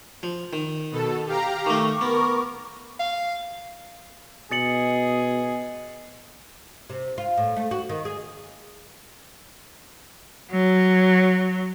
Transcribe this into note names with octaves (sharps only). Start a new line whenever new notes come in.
F3
D#3
B2 A4
G4 F5 A#5
D#3 A3 C#6 D6
B3 A#4
F5
B2 G#4 D#5 A6 C#7 F#7
C3
F4
A2
A3
F#4
D#3
G#4
F#3